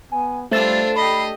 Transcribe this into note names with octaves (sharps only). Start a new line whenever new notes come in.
B3 G#5
G3 A3 D4 F4 C5 A5 E6
G4 D#5 B5 C7